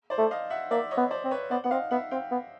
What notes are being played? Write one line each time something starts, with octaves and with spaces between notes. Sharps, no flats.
C5 D5
A3
D#5 F5
E5 F#5
A#3 D5 E5
C#5 D#5
B3
C5 D5
C4
B4 C#5
B3 C5 D5
B3 F#5
C4 D#5 F5
B3 E5 F#5
C4 F5 G5
B3